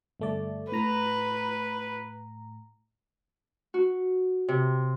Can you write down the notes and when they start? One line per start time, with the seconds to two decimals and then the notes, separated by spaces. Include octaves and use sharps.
0.20 G1 A3 D5
0.72 A2 B4 A#5
3.74 F#4
4.48 C3